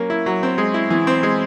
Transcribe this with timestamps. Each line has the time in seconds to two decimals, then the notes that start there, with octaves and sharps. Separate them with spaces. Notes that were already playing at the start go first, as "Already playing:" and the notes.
Already playing: F#3 A#3 C#4
0.10 E4
0.26 F#3
0.43 C4
0.58 G#3
0.74 E4
0.90 E3
1.07 C4
1.23 G#3